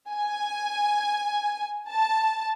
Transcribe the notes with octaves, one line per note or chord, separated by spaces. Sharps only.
G#5
A5